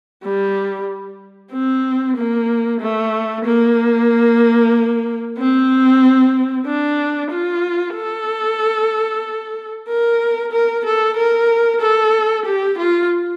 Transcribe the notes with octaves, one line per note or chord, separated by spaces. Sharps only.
G3
C4
A#3
A3
A#3
C4
D4
F4
A4
A#4
A#4
A4
A#4
A4
G4
F4